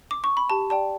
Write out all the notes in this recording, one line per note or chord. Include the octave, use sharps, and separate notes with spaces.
D6
C#6
B5
G4 A5
D5 G5 A5